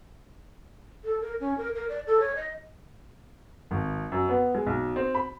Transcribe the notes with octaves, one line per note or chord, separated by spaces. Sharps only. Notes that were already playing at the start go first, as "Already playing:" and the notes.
A4
A#4
C#4
A#4
A#4
D5
A4
C#5
D#5
G#1
F#2
B3
G#3
B1
C4
B5